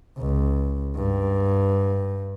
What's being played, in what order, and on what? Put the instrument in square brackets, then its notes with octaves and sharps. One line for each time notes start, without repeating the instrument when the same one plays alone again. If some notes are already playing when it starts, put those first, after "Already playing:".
[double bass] C#2
G2